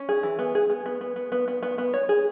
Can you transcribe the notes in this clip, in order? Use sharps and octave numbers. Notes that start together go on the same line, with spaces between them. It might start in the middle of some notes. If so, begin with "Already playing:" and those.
Already playing: C#4
G#4
E3
B3
G#4
B3
B3
B3
B3
B3
B3
B3
B3
C#5
G#4